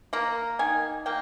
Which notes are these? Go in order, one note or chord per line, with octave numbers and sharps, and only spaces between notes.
A#3 A#5
D#3 G#5
A#3 G5